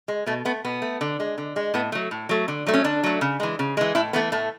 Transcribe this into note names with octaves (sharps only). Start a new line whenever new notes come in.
G#3
B2 A3
A3 B3
B2 B3
A3
D3
G#3
D3
G#3
A2 B3
F#3 A3
A2
F#3 A3
D3
F#3 A3
C#4
D3 D4
F#3 A3
C#3
E3 G#3
C#3
E3 G#3
A2 E4
E3 A3 B3
A2 A3